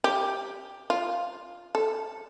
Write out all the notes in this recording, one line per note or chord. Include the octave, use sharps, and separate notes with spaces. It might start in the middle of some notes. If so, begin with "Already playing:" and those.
G4
F4
A4